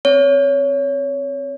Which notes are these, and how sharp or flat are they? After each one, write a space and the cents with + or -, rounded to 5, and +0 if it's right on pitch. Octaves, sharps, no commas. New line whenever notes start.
C4 +0 C#5 +20